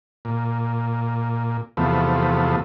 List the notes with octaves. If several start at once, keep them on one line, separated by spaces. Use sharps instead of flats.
A#2
E2 C3 F3 A3 B3